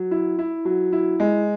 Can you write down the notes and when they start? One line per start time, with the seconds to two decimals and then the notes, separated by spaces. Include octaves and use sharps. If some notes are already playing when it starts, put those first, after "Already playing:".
Already playing: F#3
0.11 E4
0.39 E4
0.65 F#3
0.92 E4
1.20 G#3